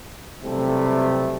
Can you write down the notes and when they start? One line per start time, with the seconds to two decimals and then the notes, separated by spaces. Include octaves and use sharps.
0.44 B1 C3 G3 A3 E4